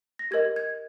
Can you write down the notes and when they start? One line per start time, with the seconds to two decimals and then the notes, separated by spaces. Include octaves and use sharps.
0.19 A#6
0.31 G4 A#4 D#5 G#6
0.56 G#6